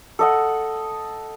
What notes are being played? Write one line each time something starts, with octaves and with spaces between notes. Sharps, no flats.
A4 D#5 F#5